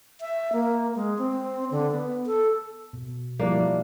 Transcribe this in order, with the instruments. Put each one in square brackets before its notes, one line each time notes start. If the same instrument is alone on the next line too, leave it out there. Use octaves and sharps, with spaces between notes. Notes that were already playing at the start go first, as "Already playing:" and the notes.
[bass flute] E5
A#3
G#3
C4
D3
B3
A4
[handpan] B2
[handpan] F3 G3 E4 [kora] A#3 D4
[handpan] F#3 D#4